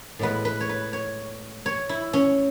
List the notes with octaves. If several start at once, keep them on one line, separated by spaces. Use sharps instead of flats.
A2 G#3 B3 B4
B4
C#5
B4
C#5
C#5
E4
C#4